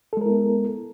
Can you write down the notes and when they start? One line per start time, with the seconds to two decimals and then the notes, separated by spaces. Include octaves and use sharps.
0.13 A4
0.17 G#3
0.21 A#4
0.26 E4
0.30 B3